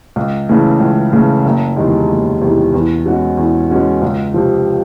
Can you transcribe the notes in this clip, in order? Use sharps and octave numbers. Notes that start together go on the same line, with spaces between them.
C#2
C#3 E3 A3
C#2
C#3 E3 A3
F#1
E2 C3 D#3 G#3
F#1
E2 C3 D#3 G#3
E2
B2 G#3 C#4 F#4
E2
B2 G#3 C#4 F#4
C#2
C3 F3